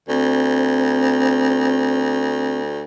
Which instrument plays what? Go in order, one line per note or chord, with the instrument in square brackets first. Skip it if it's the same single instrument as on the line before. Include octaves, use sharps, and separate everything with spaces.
[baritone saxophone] D2 [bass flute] C4